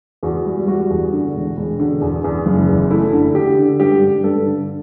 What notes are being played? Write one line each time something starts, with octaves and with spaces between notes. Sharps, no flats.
E2 F#4
G3
G3 F#4
E2
D3
E1
E1
D3
E2
E2
F#1
E2
A3 E4
D3
D3 G4
D3
G2 G4
G2
G2 A4
D3